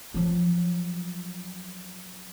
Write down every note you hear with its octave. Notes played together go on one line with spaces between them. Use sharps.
F3 F#3